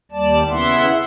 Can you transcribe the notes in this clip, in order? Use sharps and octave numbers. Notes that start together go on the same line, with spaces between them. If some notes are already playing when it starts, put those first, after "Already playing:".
D#2 G3 D5 A5
C#3 B3 E4 E5 F#5 C6